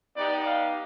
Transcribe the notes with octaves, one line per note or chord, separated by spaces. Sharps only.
B3 D#4 G4 D5
F5